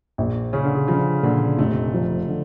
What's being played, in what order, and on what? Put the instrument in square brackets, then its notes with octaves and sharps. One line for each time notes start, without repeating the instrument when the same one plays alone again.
[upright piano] A#1
[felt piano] C#3 [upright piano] C#4
[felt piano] D3
C#3
[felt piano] C#3 [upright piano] F3
[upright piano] A#2 [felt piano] D3
[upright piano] F1 [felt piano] A3
[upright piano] F3
D3